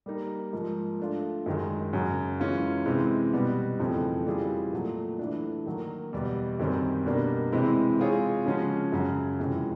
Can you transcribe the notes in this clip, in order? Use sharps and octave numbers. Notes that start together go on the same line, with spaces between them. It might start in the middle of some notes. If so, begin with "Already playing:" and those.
G3 A#3 D#4
G#2 F3 A#3
A3 D4 F4
F#2 D#3 G#3
F#2 C#3 F#3
E3 G#3 C#4 F4
C3 E3 G#3 C4
B2 G3 B3
F2 C#3 E3 A3 C4
E3 G3 C4 F4 G#4
A#2 F#3 A3
E3 A3 D4
D#3 F#3 A#3
E2 B2 G3
F#2 D#3 G3 C4
B2 G3 A#3 D4
C3 E3 G#3 C4 E4
G#3 C4 F4 G#4 C#5
C#3 F3 G#3 C#4 F#4
F#2 C#3 F#3
F2 C3 E3 G#3 C#4